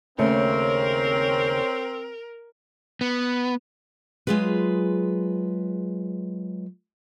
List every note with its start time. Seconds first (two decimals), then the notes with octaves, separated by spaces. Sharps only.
0.18 D#2 C#3 A3 C4 A#4 C#5
3.01 B3
4.27 F#3 G#3 D#4 F4 G#4 B4